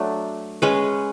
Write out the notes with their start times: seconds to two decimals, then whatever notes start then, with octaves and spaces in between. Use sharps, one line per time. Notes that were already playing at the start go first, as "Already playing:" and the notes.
Already playing: F#3 A3 D4
0.62 G#3 C#4 G#4 B4